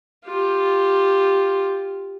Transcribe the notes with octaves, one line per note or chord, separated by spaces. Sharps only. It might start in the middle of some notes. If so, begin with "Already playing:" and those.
F4 G4